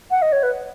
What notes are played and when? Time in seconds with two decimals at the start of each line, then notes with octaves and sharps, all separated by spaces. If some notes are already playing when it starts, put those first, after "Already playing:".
0.11 F#5
0.22 D#5
0.32 C#5
0.43 B4